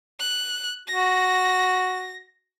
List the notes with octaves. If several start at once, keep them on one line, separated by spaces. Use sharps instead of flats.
F#6
F#4 A#6